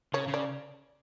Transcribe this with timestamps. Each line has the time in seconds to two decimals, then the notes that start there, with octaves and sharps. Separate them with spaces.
0.13 C#3 C#5
0.28 C#3
0.34 D5